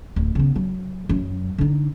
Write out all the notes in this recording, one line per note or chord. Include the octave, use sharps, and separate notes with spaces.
D1
C#3 B3
F#3
F#2 F#3
D3 D#4